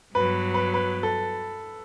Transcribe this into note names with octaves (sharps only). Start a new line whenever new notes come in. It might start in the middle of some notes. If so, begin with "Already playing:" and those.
G2 F#3 B3 B4
B4
B4
A4